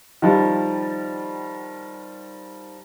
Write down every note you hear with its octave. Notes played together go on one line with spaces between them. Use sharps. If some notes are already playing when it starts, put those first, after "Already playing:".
D#3 F3 G3